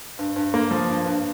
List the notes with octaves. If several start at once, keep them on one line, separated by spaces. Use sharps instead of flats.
G2
G2
A#3
F3
G2
G2